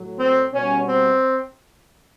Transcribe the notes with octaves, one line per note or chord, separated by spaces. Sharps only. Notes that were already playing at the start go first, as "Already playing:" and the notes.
Already playing: A2 F#3
C4
B2 G3 C#4
C4